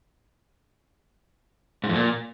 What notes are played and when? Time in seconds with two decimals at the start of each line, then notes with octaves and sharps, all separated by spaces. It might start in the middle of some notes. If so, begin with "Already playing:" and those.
1.84 G#2
1.89 F2
1.95 A#2